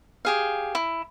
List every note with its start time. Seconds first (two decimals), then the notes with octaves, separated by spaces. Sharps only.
0.25 G4 G#4 F5
0.75 E4